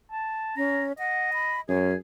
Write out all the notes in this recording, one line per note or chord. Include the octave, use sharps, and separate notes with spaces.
A5
C#4 A#5
D#5 F#5
B5
F#2 C#4 G#4